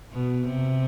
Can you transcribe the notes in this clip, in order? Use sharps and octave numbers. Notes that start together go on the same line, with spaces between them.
B2
C3